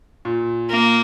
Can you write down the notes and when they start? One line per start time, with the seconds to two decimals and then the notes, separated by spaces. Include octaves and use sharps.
0.25 A#2
0.70 A#3